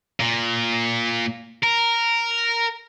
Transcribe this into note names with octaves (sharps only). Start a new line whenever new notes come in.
A#2
A#4